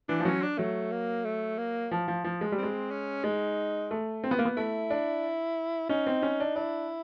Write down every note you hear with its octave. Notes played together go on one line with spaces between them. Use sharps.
E3 D4
F3
F#3 C#4
D4
F#3 A3
A#3
A3
A#3
F3
F3
F3
G#3
G3
G#3 C4
C#4
G#3 D#4
A3
C4
B3
A#3
B3
A3 E4
D4
C#4 D#4
C4
C#4
D4
D4 E4